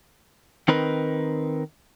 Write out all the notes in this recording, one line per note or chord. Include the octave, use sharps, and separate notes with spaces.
D#3 C4 D#4 A#4 B4